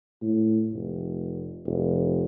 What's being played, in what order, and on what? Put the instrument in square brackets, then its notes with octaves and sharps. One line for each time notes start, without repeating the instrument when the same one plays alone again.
[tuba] A2
F1
F1